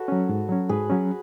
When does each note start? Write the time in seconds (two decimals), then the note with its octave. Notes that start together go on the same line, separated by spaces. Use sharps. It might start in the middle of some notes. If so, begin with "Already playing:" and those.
Already playing: F#4 A4 B4 C#5
0.08 F#3 C#4
0.29 G#2
0.49 F#3 C#4
0.69 G#2 G#4 B4
0.90 F#3 C#4